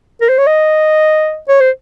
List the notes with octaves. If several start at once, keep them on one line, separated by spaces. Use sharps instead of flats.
A#4
C5
C#5
D#5
C#5
C5